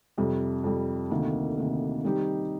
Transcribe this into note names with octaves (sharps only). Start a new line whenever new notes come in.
F2 C3 G3
F2 C3 G3
D2 C3 D#3 A#3
D2 C3 D#3 A#3
D#3 G3 C4 D#4 G4